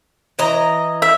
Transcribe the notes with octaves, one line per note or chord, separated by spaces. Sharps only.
E3 D#5 A#5
E5